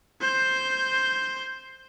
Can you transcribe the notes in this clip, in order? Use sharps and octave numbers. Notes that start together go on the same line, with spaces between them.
C5 G6